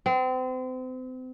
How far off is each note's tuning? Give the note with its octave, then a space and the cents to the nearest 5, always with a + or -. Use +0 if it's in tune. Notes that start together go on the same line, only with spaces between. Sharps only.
C4 -35